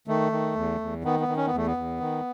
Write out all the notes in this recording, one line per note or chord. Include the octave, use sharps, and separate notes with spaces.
D#3 A3
D#3
E2
E2
D#3 B3
B3
D#3
C#4
B3
E2 A3
B3
E2
D#3